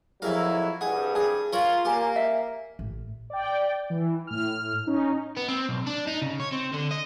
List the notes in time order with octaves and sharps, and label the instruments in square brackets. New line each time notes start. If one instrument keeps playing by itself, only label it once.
[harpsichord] F2 E5 F5 [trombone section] F#3 E4 [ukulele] F#4 G#4 A#4
[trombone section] C2 G2 [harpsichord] G#4 [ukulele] F#5
[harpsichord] G#4 [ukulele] A5
[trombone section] F4 [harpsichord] A#4 C#5 B5
[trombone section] A#3 [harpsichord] G4 [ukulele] C#5 G#5 A#5
[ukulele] E5
[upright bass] A1
[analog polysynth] D5 G5
E3
A2 F6
C#4 D#4
[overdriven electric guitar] B3
C4
B1
D4
D#4
C#3
C#5
C4
D3
D#5